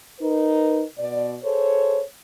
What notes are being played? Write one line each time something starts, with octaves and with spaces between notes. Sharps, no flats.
D#4 A#4 B4
B2 D5
G#4 A4 C5 C#5